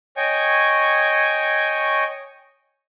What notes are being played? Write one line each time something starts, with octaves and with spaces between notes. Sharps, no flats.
C#5 D#5 G5 G#5 C#6